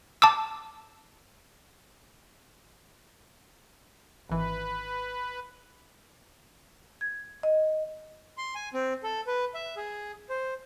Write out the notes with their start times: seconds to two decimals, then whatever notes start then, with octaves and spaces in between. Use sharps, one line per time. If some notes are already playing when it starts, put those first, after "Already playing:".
0.22 A5 D6 E6
4.29 G#1 E3 B4
7.01 G#6
7.43 D#5
8.38 C6
8.55 G#5
8.74 C4
9.03 A4
9.27 B4
9.54 E5
9.77 G#4
10.29 C5